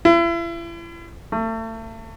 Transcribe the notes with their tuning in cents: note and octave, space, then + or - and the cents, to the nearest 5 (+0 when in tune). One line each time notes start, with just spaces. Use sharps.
E4 +40
A3 +35